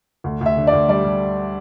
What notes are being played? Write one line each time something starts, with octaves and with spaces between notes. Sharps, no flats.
D2
D2 E5
D3
D5
D2
G3 D5
G3